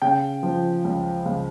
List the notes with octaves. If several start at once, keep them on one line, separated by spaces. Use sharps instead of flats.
C#3 G5
F3
C#2
C#2